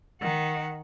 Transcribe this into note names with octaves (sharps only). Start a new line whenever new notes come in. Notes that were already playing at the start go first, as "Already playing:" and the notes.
D#3 F#5